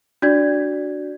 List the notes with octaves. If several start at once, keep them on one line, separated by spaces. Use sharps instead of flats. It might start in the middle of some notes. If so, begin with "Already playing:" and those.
D4 F#4 D5 G#6